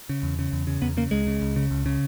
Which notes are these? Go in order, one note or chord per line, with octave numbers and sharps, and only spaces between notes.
C#3
E2
C#3
E2
C#3
E2 B3
C#3 A#3
C#2 G#3
C#3
C#2
C#3
C#2
C#3